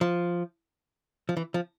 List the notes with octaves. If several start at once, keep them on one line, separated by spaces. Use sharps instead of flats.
F3
F3
E3
F3